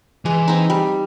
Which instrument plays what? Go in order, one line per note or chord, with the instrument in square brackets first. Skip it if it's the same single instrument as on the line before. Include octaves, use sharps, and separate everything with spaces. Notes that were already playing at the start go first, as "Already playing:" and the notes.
[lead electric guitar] E3 [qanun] G#3
[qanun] C4 D#4
G3